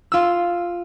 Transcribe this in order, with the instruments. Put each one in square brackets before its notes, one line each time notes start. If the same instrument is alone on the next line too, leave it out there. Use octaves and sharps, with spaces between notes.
[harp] F4 E6